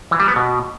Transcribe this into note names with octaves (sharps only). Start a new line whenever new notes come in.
E3
G3
B3
B2